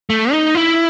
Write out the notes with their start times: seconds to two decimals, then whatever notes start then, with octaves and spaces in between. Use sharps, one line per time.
0.10 A3
0.32 D#4
0.55 E4